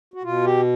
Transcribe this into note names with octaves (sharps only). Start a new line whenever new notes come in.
F#4
B2 F4
G4